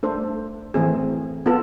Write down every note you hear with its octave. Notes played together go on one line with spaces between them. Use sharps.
A3 D4 A4 C5
E3 A3 C4 G#4
B3 F4 A4